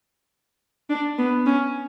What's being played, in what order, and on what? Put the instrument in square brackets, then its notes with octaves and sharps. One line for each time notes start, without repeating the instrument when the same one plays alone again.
[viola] D4
B3
C#4